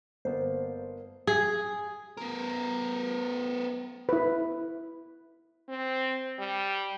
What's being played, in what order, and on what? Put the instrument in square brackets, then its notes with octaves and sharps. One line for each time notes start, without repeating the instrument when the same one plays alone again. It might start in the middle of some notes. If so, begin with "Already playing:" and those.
[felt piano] G1 A#3 B3 [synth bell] C5
[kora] G#4
[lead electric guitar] B3 A#4
[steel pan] E4 B4
[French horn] C4
G3